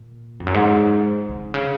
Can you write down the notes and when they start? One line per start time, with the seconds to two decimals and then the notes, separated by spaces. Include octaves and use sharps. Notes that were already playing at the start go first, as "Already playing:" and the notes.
Already playing: A#2
0.40 F2
0.47 F#2
0.54 G#2
1.29 C3
1.54 C#3